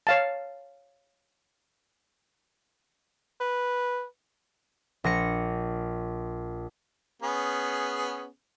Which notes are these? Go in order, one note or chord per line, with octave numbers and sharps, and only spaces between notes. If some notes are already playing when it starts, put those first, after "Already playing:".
C#5 F5 A5
B4
A#1 A#6 C#7
B3 C#4 G#4